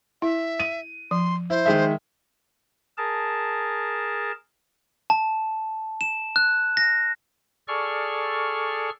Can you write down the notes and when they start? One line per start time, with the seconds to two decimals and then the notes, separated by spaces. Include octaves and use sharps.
0.22 E4 E5
0.60 D#7
1.11 F3 C6
1.50 E4 C5
1.66 D#3 G#3 E5
2.98 G#4 A#4 A5
5.10 A5
6.01 E7
6.36 F#6
6.77 A#6
7.68 G#4 A4 D5 C#6 F6